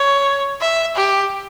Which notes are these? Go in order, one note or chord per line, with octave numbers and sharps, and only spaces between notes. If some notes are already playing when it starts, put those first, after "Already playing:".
Already playing: C#5
E5
G4